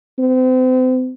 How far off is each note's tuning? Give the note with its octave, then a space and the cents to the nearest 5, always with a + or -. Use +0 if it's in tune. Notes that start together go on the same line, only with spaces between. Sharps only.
C4 -35